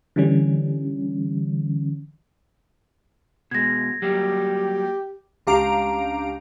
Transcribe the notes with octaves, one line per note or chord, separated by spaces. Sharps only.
D3 E3 G3 C#4
B2 G#3 G#6 A#6
F#3 G3 A#3 G4
C#2 D4 G4 F5 A#5 D7